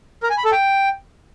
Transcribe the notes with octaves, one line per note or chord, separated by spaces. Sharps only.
A#4
G#5
B5
A4
G5